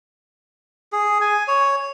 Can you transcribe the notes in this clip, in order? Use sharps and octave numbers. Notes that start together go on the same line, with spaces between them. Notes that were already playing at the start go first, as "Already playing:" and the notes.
G#4
G#5
C#5